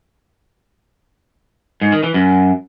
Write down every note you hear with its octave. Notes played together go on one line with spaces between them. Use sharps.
G#2
D#3
E3
F#2